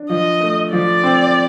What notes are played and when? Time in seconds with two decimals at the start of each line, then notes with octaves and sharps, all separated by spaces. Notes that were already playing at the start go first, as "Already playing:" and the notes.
Already playing: D4
0.10 F3 D#5
0.40 A3
0.73 F3 D5
1.04 C4